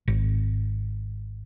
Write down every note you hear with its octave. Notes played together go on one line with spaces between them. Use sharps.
G#1